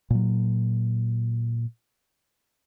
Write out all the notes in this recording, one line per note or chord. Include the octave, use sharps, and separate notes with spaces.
A#2 F#3